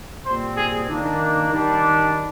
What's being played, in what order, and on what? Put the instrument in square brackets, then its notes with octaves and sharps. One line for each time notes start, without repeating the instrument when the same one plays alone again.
[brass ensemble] A#2 G3 C4 C5
G#4
D#3 A#3 D4
D#3 G3 D4